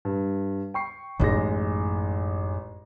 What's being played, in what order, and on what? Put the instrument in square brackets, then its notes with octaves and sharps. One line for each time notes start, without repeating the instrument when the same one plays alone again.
[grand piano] G2
G5 C#6 C7
[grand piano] A1 G#3 A#6 [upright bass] F#2 D#4